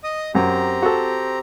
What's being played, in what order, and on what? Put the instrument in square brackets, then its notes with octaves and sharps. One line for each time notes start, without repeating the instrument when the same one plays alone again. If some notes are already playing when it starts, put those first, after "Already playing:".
[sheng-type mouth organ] D#5 D#6
[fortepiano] F#2 [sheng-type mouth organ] C4 G4 A#5
[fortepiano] F#4 A4